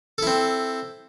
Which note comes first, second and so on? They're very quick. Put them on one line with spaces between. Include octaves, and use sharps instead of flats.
A4 E4 C4